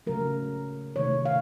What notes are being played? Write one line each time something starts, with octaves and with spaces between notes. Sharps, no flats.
C#3 F#3 A3 A#4
C3 D#3 A3 C#5
F5